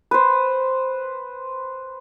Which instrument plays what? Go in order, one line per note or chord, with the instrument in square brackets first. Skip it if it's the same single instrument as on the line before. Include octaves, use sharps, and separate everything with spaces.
[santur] B4 C5